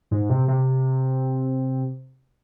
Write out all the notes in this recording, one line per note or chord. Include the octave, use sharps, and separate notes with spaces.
G#2
C3
C3